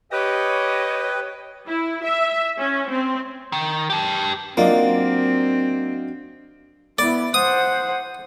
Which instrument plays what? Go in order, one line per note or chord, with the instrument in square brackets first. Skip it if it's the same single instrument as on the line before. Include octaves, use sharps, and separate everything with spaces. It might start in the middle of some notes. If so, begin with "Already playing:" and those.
[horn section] G4 D#5 [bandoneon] B4 [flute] C#5
[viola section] E4
E5
C#4
C4
[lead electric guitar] D#3
G4 A5
[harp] F#3 D4 [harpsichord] A#3 [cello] C4 [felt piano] F4 D5 D#5
[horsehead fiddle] B3 E4 [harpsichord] D5
[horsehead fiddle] C5 F#5 [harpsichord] D#6